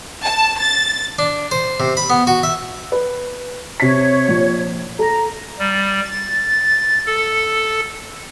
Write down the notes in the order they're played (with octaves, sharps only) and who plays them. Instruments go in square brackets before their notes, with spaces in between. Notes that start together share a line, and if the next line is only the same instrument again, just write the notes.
[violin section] A5
A6
[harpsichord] D4
C5
C3
B5
B3
F#4
E5
[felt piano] B4
[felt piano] C3 B6 [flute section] C#5
[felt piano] A#1
[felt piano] A4 [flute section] A#5
[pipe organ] G3
A6
A4